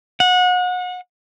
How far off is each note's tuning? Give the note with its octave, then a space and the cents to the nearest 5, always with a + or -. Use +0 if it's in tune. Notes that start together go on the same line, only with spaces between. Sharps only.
F#5 -30